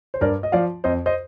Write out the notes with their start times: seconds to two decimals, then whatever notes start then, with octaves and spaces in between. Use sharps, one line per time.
0.14 C5
0.21 G2 A#4 D5
0.43 D#5
0.52 F3 D5 F5
0.84 F2 C5 D#5
1.06 C5 D#5